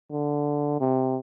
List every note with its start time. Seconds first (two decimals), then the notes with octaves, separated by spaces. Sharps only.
0.12 D3
0.81 C3